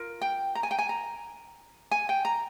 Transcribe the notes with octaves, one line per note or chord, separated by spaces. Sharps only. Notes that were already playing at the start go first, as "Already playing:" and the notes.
Already playing: F4 A#4
G5
A#5
G#5
G5
G#5
A#5
G#5
G5
A#5